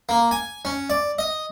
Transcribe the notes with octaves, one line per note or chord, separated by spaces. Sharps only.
A#3
G#5
C#4
D5
D#5